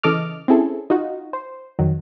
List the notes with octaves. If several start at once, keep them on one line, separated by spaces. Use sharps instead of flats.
C#3 E3 A4 D#5 D6 F6
C4 C#4 E4 G#4 A4
D#4 F4 F#4
C5
F2 D#3 F#3